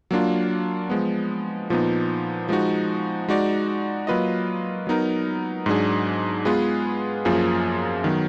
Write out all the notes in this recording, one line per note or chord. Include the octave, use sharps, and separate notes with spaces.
F#3 A#3 D4 F4
F3 G#3 B3
A#2 F3 B3 D#4
F3 G#3 D#4 F#4
G#3 D#4 F#4 D5
F#3 A#3 F4 B4 D#5
F#3 B3 D#4 A#4
G#2 F#3 D4 G#4
G#3 B3 F4 G#4 B4
F#2 F3 A#3 F4 G#4
D#3 F#3 B3